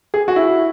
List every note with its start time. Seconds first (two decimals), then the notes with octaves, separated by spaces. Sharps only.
0.14 G#4
0.28 F#4
0.36 E4